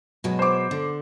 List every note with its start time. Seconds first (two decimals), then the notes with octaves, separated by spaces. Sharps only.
0.24 B2 F#3 G#3
0.39 C5 D6
0.71 D3